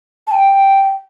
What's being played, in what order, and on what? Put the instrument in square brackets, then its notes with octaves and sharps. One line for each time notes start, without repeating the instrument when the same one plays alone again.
[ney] A5
G5